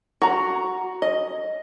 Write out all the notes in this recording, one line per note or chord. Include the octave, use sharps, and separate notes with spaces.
F#4 A#5
D#5